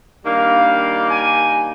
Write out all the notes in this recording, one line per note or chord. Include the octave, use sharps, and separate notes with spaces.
D#3 G3 A#3 D4 F5
G#5